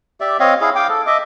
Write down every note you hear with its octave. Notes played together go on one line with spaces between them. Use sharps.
G4 D5 E5
C4 C#5 D#5 F5
E4 G#4 F5
F5 G5 D6
A4
D#5 E5 D6